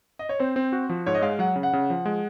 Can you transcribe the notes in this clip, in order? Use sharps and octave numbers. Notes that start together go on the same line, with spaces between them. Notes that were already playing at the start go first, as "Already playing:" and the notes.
D#5
C#5
C4 C5
C4
F#4
F3
G#2 C#5
D#5
G#3 F5
F#3 F#5
C#3
F#5
C#3
F3
G#3